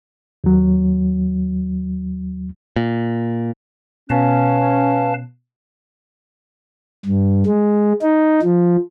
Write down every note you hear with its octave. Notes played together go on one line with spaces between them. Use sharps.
D#2 F#3
A#2
B2 C#4 B4 F5 A5
G2
G#3
D#4
F3